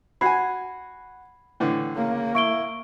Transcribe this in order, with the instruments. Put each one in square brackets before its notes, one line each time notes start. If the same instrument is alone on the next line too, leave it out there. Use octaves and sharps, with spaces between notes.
[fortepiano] F#4 G#5 [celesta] B5 G#6 C7
[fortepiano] A2 D3 E3
[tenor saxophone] C#3 [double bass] A#3
[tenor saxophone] E4 [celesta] C#6 D7 G7